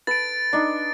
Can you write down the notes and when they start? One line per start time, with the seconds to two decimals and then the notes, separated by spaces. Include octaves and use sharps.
0.07 A4 B4 A6 D7
0.53 D4 D#4